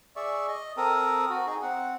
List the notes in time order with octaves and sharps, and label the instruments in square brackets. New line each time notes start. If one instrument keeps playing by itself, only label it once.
[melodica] G#4 D5 E5 C#6
D#5
C4 A4 A#4 D#6
F#4
D#4 G#4
C4 F#5